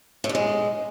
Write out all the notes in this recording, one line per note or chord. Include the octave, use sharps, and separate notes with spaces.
A2
G2
G#3